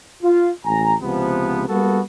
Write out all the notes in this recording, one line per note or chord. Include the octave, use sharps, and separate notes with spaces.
F4
A1 G#5 A#5
C#2 C3 F3 B3
G3 A#3 B3 F#4 A4